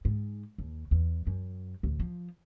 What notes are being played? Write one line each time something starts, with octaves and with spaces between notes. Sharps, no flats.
G#2
D#2
E2
F#2
D2 A2
F3